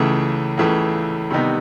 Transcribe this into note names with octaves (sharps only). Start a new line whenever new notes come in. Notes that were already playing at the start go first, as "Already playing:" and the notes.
Already playing: C#2 C#3 E3 A3
C#2 C#3 E3 A3
C3 D#3 G3 B3 D#4